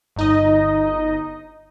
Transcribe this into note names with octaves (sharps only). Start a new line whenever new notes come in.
G1 D#4 D#5